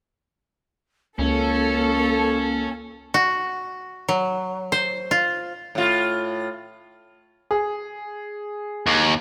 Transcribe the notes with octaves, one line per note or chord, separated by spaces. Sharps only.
C#2 A#3 C#4 A4
F#4
F#3
C5
F4
A2 F4
G#4
D#2